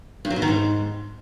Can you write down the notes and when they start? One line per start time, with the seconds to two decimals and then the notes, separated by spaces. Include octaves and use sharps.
0.25 G2
0.30 F#3
0.36 B2
0.42 D#3
0.48 G#2